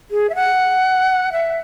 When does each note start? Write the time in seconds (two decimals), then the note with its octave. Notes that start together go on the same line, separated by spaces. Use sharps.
0.11 G#4
0.30 E5
0.35 F#5
1.32 E5